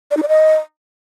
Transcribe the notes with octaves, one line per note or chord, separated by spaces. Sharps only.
D5
D#4
D5
D#5